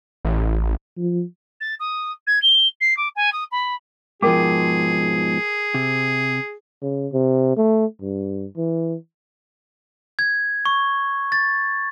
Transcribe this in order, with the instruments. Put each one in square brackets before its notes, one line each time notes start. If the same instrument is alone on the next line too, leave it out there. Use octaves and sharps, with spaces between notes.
[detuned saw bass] A1
[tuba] F3
[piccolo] A6
D#6
G#6
G7
C7
D6
G#5
D#6
B5
[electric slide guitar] G#2 B2 F3 [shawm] G#4 [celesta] A#4 G5 D6
[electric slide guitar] C3
[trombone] C#3
C3
A3
G2
E3
[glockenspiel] G#6
C#6
A6